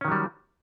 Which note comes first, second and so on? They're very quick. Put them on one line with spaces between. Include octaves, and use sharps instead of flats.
C#4 D#3 F#3 G3